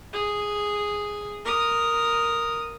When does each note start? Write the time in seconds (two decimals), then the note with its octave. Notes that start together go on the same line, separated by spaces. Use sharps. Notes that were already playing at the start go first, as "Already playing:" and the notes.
0.13 G#4
1.45 A#4 D#6